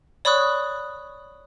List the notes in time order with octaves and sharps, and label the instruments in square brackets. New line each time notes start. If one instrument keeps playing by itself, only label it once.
[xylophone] C#5 D5 B5 C#6 D#6 F#6